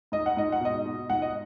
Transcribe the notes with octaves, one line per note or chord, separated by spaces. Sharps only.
G#2 D#5
F#5
G#2 D#5
F#5
B2 D#5
B2
G#2 F#5
D#5